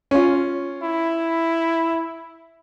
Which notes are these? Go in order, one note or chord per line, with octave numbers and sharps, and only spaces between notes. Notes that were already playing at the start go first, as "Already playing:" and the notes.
C#4 F4
E4